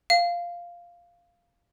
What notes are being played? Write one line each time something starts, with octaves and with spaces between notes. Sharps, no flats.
F5